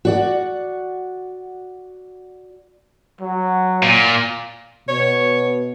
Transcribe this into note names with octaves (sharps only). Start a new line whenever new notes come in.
F#4 D5 F#5
F#3
A#2
B2 C#5